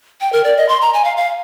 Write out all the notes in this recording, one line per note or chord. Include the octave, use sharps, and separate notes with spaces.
G5
A#4
D5
D#5
C6
A#5
G#5
F5
F5